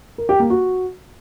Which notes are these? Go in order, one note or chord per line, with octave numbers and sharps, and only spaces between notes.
A#4
G4
A#3
F#4